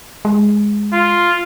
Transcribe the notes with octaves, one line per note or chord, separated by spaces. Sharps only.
G#3
F4